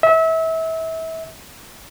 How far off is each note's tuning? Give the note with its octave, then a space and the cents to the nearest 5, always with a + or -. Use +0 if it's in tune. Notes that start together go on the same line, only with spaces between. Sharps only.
E5 -30